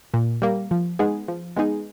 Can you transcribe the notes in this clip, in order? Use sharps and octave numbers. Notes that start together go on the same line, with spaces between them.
A#2
G3 A#3
F3
G#3 B3 D#4 G#4
F3
G#3 B3 D#4 G#4